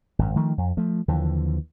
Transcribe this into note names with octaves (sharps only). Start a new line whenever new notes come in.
G#1 F#2
D#3 F3 A3
F2
F3 A3
D#2 D3 E3 F3